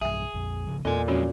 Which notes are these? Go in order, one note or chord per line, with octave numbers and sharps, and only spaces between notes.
B1 G2 G#4 E5 G#5
A#1 F2
A1 C#3 F3
E2 A#2 A4 D#5 G#5
F2 G#3 C#4 F#4 C#5